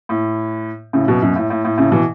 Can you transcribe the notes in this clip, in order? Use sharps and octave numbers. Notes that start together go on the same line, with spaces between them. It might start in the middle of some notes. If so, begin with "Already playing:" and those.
A2
A2 C#3
F#2 B2
F#2 B2
A2
A2
A2
A2 C#3
B2 E3